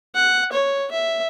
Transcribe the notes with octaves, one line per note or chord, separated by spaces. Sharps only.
F#5
C#5
E5